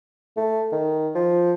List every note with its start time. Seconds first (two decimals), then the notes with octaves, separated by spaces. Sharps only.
0.36 A3
0.72 D#3
1.15 F3